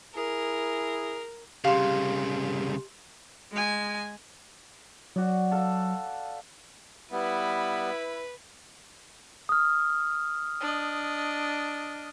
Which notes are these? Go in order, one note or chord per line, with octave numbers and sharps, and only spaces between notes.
E4 G#4 A#4
C2 C#3 G4 F5 C6 C#6
G#3 G#5
F#3 F#4 D5
A4 F5
G3 B3 E4 B4
D#6 F6
D4 D#5